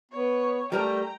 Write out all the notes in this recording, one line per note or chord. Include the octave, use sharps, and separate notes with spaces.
B3 C#5
G3 A3 A#4 G5 A5 A#5